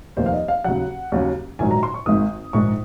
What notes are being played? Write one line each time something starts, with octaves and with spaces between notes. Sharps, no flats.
F1 D#2 D#3 A#3 C5
F5
D#5
F5
D#2 C#3 F#3 F#5
D#2 C#3 F#3 C#4
A#1 G#2 D#3 F#3 G#5
A#5
C6
C#6
G#1 G#2 D#3 A#3 D#6
A#1 G#2 D#3 G#3 C#6